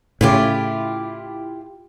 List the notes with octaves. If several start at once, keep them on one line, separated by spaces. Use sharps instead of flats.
A2 C#3 E4 F4 G4